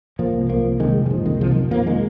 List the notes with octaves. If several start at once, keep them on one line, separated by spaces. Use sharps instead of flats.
A#2 F3 A#3
C2
A#2 F3 A#3
C2
C3 D#3 G#3
F2
D#3
A#2 F3
C2 D#3 G#3
C3 F3
D#3
F2
A#2 F3 A#3
D#3 G#3